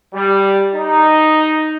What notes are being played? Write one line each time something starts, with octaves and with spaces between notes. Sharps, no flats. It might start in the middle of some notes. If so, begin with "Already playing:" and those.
G3
D#4